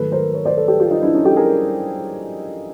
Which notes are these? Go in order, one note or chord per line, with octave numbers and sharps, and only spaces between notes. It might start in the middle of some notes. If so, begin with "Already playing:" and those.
Already playing: G#2 D#3 F#3 A3 A4 B4
A#4 C5
B4 C#5
C5 D5
A4 B4
G4 A4
F4 G4
D#4 F4
D4 E4
C#4 D#4
G4 A4
G#4 A#4